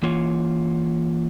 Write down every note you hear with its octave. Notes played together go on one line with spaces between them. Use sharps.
E3 A#3 F4 C#5